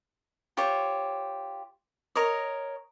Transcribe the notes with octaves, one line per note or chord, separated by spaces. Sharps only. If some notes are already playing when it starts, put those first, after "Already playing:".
F4 G4 C5 C#5
A#4 C#5 D#5